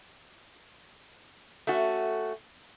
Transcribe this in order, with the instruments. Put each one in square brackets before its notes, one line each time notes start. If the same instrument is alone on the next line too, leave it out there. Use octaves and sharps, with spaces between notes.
[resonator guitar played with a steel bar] A3 C#4 F#4